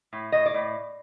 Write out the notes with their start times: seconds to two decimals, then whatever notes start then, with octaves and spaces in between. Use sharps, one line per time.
0.13 A2
0.32 A2 D#5
0.46 D5
0.54 A2